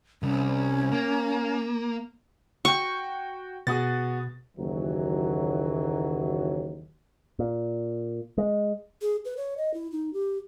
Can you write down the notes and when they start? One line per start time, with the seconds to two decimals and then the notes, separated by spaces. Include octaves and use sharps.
0.23 C2 C#4
0.92 A#3
2.65 F#4 G5 C#6
3.67 B2 B3 F#4 G#4 A6
4.57 F#1 D#2 E3 F#3
7.39 A#2
8.38 G#3
9.01 G#4
9.25 B4
9.37 C#5
9.57 D#5
9.74 E4
9.92 D#4
10.13 G4